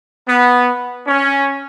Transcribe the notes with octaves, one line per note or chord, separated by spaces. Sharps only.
B3
C#4